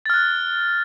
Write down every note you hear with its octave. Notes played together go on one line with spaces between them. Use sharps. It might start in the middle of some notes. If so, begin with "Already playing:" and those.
F6 F#6 A6